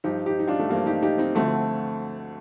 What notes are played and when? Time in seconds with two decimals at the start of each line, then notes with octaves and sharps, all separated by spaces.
0.04 G2 F3 D#4 G4
0.26 D#4 G4
0.39 D#4
0.47 D4 F4
0.59 A3
0.69 G2 F3 A#3
0.86 D#4 G4
1.02 D#4 G4
1.18 C4 D#4
1.35 D2 D3 F3 A3 C4